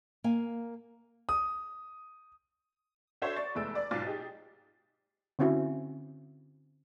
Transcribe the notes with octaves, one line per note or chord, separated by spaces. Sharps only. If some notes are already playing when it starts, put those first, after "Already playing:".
A#3 F5 G#5
D#6
D4 F#4 A4 C5 C#5 E5
D5 C#6 A6
F1 E2 G#3 A3 E6 D7
D5
B1 G#2 F4 D6 A6
D#4 G4 G#4
D3 C4 C#4 E4 F#4